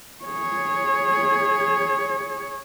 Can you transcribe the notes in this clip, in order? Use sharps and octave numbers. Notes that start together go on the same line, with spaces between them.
G#4 C#5